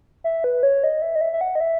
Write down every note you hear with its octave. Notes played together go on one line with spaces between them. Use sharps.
E5
B4
C#5
D#5
E5
D#5
E5
E5
F#5
D#5
E5